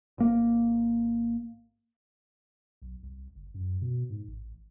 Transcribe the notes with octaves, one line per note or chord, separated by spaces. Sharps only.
G#1 A#3
B1
C2
F#1
F#2
B2
G#2
A1